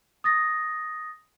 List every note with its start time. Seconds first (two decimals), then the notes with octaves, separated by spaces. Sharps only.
0.24 D#6 A6 A#6